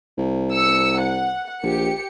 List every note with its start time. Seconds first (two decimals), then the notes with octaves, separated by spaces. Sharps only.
0.18 C2
0.54 E6 C#7
1.00 F#5
1.63 A#1 G4 C#7